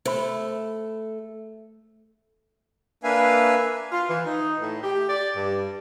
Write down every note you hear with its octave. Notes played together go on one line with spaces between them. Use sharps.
A3 C5 B5
A#3 D4 B4 E5 F5 G#5
F4
E3
D#4
A2
G4
D5
G2